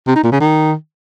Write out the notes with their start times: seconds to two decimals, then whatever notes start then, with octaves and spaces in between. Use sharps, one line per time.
0.07 C3
0.15 D#4
0.23 A#2
0.32 C#3
0.40 D#3